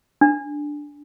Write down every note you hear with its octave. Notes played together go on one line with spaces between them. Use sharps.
D4